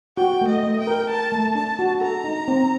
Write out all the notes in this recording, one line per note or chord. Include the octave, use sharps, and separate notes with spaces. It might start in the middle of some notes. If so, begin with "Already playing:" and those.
F#4 G5
A3
D#5
A3
G5
A#4
A#4 A5
A3
D4 A5
F#4
A4 A#5
D#4
C4